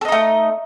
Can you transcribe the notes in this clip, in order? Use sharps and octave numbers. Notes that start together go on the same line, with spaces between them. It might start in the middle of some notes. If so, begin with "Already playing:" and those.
A3 D#4 A4 D#5